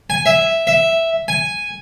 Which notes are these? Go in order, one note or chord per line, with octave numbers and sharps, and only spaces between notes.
G#5
E5
E5
G#5